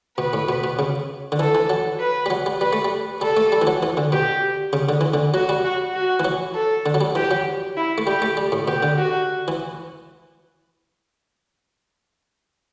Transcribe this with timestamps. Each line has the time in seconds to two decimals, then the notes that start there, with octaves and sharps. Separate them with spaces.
0.18 B2 B4
0.33 A2
0.49 B2
0.64 B2
0.79 C#3
1.32 D3
1.39 E3 A4
1.55 E3
1.70 F#3
2.00 B4
2.26 G3
2.30 F#3
2.46 G3
2.60 G3 B4
2.73 A3
2.85 G3
3.21 G3 A4
3.37 A3
3.52 G3
3.62 E3
3.67 F#3
3.83 E3
3.97 D3
4.12 B2 G4
4.73 C#3
4.89 D3
5.01 E3
5.14 D3
5.34 F#3 F#4
5.49 G3
5.64 F#4
5.94 F#4
6.20 E3
6.25 F#3
6.55 A4
6.86 D3
6.94 F#3
7.01 G3
7.15 E3 G4
7.31 F#3
7.76 E4
7.98 A3
8.07 G3 G4
8.22 A3
8.37 G3
8.52 A2
8.67 B2 G4
8.83 D3
8.98 F#4
9.48 E3